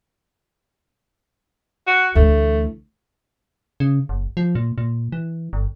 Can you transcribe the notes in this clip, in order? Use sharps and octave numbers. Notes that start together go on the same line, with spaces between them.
F#4
D2 E3 A3
C#3
F#1
F3
A#2
A#2
E3
G1